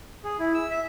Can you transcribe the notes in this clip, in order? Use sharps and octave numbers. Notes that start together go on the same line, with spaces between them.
G#4
E4
E6
E5